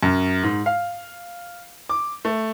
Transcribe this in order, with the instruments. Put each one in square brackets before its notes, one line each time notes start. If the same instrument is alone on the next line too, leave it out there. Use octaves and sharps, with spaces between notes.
[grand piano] F#2
G#2
F5
D6
A3